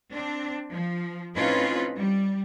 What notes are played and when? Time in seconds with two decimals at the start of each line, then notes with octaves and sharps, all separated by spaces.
0.12 C4 D4
0.71 F3
1.36 A2 C4 C#4 D#4 F4 B4
1.99 G3